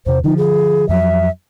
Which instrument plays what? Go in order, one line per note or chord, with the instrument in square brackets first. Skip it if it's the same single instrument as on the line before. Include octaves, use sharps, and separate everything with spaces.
[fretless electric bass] E2 C3 [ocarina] C5
[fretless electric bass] D3 F3 [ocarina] D#4
[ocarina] G#4
[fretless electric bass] F2 F3 F#3 [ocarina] E5